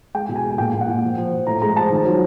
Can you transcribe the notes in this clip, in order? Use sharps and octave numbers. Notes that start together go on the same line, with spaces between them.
G#3 G5
B2
G#5
G#3
G#5
A#2 G5
A#2
F#5
A#2
F3
F3
F3
A2 A#5
G#3 A#5
F3 A5
D#3
F#3